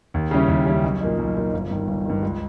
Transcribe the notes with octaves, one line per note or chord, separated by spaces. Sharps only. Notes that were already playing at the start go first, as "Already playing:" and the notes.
D#2
C#3 G3 C#4 E4
D#2
C#3 G3 C#4 E4
B1
A#2 A#3 D#4
B1
A#2 A#3 D#4
G1
G2 D#3
G1
G2 D#3
C#2